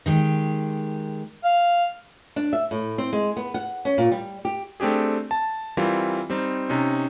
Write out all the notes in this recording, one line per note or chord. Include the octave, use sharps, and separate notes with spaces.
D#3 G#3 G4
F5
D4
E5
A2
C4
G#3
B3
F#5
C#4
A#2
G3
G4
A3 C4 D4 G4 G#4
A5
E3 G3 C4 F4 A#4
G3 C4 D#4
C3 C#4 D#4